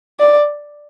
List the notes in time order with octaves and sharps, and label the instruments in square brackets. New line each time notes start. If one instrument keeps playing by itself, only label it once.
[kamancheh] D5